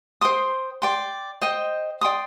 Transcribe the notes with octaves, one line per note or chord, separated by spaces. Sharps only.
C5 G5 C6 D#6
D5 G5 C6
C5 D#5 G5
D5 G5 C6 D#6